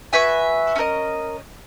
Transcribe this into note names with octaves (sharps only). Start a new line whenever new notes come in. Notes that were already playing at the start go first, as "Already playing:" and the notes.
F#4 B4 E5 G#5
C#4 F#4 A#4 D#5